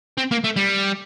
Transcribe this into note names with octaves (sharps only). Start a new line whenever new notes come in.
C4
A#3
A3
G3